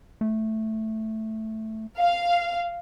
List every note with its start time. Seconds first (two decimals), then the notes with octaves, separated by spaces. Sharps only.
0.21 A3
1.97 F5